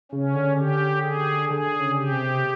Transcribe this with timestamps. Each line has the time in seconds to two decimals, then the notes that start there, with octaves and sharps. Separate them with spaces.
0.12 C#3 C#4
0.35 D3
0.58 G4
1.04 G#4
1.50 D3 G#4
1.80 C#3
1.96 G4
2.11 C3